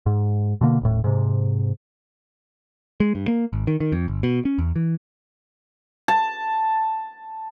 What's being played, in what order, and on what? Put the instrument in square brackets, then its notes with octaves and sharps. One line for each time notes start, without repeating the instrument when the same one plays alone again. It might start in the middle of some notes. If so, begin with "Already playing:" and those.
[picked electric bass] G#2
B2 D3 A#3
D#1 A2
G#2 C3
G#3
G2
A#3
G#1
D#3
D#3
F2
G1
B2
C#4
E2
E3
[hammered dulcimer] A5